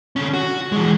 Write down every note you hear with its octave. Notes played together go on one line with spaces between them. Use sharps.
D3 C#4
F#4
E3 G#3